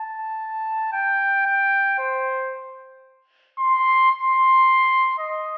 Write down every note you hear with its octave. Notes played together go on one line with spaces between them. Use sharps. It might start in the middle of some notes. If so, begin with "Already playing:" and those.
Already playing: A5
G5
G5
C5
C6
C6
D#5